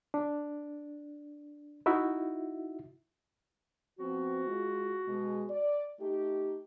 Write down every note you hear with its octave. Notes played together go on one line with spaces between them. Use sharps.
D4
D#4 E4 F#4 E5
F3 B3 C4 F#4
G#3 F4
B2 G#3
D5
A3 D#4 G4